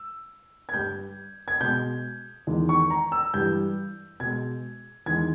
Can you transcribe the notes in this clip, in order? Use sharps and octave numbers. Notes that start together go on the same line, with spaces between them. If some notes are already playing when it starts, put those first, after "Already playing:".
Already playing: E6
G#6
G2 G3 G6
G#6
B2 G#3 G6
E2 D#3 G#3
C#6
A#5
E6
G2 E3 G3 G6
B2 G#3 G#6
E2 D#3 G#3 G#6